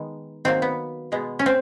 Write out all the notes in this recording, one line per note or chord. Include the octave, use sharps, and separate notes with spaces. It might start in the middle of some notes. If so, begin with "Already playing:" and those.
Already playing: D#3 G#3 B3
D#3 F#3 A#3 C4
B3
B2 G#3 B3
C#4
C4